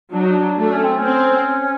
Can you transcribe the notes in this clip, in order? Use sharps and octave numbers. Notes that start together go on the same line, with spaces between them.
F#3 D4
D#4
D4
A3 D4
C#4
C4
C#4
C4